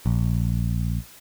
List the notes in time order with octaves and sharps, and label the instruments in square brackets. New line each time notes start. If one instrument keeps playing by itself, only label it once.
[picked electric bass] A#1